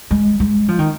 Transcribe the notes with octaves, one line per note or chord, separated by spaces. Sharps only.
G#3
G#3
F3
D#3